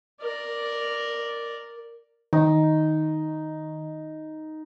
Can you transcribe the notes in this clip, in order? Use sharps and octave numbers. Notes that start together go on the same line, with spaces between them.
A#4 D5
D#3 D#4